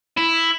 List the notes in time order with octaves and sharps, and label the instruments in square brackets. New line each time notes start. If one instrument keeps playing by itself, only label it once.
[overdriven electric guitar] E4